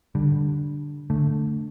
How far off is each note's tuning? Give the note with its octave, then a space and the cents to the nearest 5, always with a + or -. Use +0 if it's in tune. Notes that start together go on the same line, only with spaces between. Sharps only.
D3 +0 G3 +0
D3 +0 A3 +0